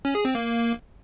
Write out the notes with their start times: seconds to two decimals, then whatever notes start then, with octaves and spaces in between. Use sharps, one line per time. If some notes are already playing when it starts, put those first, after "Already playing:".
0.05 C#4
0.15 G#4
0.25 C4
0.35 A#3